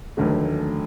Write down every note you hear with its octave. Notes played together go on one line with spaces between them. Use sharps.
F1 D#2 D3 F#3 A3